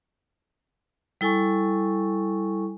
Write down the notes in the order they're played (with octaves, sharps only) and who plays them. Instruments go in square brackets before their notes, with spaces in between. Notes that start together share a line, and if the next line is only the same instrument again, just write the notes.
[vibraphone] G3 E4 A4 G#5 C#6